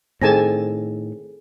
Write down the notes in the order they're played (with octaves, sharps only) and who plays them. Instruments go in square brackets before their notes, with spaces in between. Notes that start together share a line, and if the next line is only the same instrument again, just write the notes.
[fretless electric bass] A2 D#3 [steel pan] C4 G#5 A5 [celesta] G#4 A4 A#6